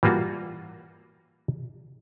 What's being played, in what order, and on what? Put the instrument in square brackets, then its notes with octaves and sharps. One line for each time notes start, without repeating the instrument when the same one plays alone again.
[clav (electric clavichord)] E3 G3 A#3 F4 F#4